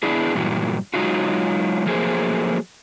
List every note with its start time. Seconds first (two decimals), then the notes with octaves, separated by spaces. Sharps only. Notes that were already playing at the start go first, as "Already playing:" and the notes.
0.03 B3 D4 E4 G#4
0.35 G2 A#2 E3 F#3
0.94 F#3 G#3 D#4 F4 F#4
1.86 F3 F#3 A3 A#3 G#4 C5